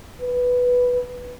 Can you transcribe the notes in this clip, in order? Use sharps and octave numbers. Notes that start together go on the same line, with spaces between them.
B4